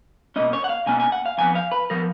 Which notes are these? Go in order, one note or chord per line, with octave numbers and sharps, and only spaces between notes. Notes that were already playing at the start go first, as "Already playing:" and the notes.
B2 A#3 C#4 D#5
C#5
F#5
F5
B2 A#3 C#4 G#5
G#5
F#5
F5
F2 F3 B3 G#5
F5
B4
F3 B3 A#4